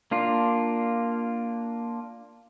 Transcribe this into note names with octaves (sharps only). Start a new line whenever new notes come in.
A#3 D4 F4